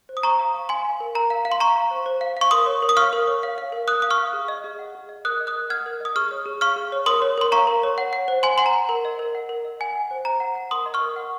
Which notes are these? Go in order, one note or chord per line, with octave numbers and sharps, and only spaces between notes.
C5
D#6
C5 A#5 C#6
F5
F5
F5 G#5 C6
F5
A#4
A#4 A#5
F5
F5
C6
F5 A#5 C#6
F5
C5
C5
F5
F5 C#6
A#4 C6 D#6
C#5
A#4
D#6
F5 C#6 F6
A#4
C#5
F5
F5
A#4
A#4 D#6 F#6
F5 D#6
C#6 F6
F5
G#4
D#5
G#4
F#5
G#4
D#5
A#4 D#6 F#6
D#5
D#6 F#6
A#4
F#5 F6 G#6
A#4
D#5 D#6
G#4 C#6 F6
C#5
G#4
F5 C#6 F6
G#4
C#5
A#4 C6 D#6
C#5
A#4 C6
F5 A#5 C#6
A#4
C#5
F#5
F#5
C5
C5 G#5 C6
F#5 C6
A#5
F#5
A#4
D#5
A#4
F#5
A#4
D#5
F#5 G#5
F#5
C5
C5 A#5
F#5
F#5
A#4 C6 D#6
D#5
C#6 F6
A#4
F#5